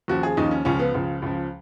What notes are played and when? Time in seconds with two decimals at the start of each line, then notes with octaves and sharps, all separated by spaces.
0.08 D#2 C#3 F3 F#4
0.23 G#4
0.37 D#2 C#3 F3 D#4
0.51 C#4
0.65 C#2 C#3 F3 C#4
0.79 B3
0.94 C#2 C#3 F3
1.22 C#2 C#3 F3